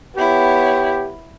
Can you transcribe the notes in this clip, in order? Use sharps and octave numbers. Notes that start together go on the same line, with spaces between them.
B3 E4 G4 C#5